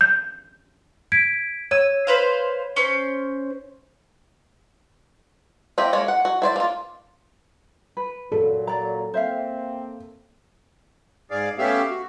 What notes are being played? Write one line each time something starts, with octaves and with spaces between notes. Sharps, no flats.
G6
G#6 B6 D7
C#5 E6 G#6 D#7
B4 C5 F5
C#4 C5
A#3 C4 E4 G4 D#5
G#3 A#3 A#4 C#5
F#5
F#4
E4 C5 D5
A#3 F4
B4
A#2 F#3 A4
D5 A#5
A#3 C4 C5 E5 F5
G#2 G#4 D5 F5
A3 B3 C#4 G4 E5 F5
F#4